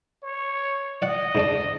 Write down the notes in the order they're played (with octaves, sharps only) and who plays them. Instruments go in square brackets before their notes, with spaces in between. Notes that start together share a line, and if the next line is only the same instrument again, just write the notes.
[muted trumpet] C#5
[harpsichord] D5 F#5 [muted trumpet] D#5
[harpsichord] G#2 D4 D5